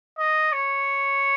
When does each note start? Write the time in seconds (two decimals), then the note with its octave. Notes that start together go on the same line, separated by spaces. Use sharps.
0.18 D#5
0.52 C#5